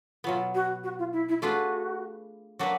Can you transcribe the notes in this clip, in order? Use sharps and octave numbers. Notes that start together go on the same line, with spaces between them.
B2 F#3 B3 F4
F#4
F#4
F4
E4
E4
A3 D4 F4 F#4 G#4 B4
F#3 A#3 D4 F#4 B4